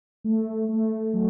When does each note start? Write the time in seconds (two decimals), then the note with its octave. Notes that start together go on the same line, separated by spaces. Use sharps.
0.24 A3
0.69 A3
1.13 F#3